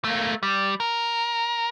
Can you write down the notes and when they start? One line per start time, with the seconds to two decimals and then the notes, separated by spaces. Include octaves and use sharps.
0.04 A3 A#3
0.43 G3
0.80 A#4